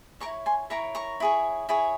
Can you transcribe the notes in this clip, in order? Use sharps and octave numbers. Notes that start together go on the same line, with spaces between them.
A#4 C#5 A#5 C#6
E4
G#5 C6
E4 A#4 C#5 A#5 C#6
A#5 C#6
E4 G#4 C#5
E4 G#4 C#5